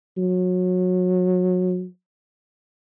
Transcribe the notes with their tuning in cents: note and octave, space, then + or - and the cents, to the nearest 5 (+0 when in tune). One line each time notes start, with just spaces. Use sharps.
F#3 -25